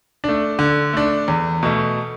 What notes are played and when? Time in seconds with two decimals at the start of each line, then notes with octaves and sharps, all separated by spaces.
0.24 A3 D4
0.59 D3
0.93 A3 D4
1.28 E2
1.63 B2 A3